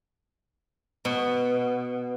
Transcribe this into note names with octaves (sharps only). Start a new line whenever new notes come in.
B2